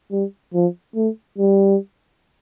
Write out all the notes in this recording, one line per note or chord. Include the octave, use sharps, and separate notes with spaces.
G3
F3
A3
G3